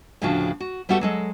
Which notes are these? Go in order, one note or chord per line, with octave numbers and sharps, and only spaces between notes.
D2 A2 C#3 F3 D4 F#4
F#4
G3 A3 B3 F#4 G4 A4
F#3 G#3 A4